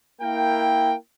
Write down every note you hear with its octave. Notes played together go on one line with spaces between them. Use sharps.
A#3 E4 A#4 G5